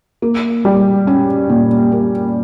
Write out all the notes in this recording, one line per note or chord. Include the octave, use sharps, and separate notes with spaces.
A#3
G3
C#4
A#2
A#3